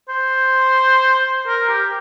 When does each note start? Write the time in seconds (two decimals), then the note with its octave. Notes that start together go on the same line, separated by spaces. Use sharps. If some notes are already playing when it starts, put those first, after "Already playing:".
0.09 C5
1.48 A#4
1.69 G4